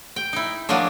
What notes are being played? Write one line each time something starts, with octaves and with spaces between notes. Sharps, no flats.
G5
D#4 E4
F3 F#3 G#3 A#3 D4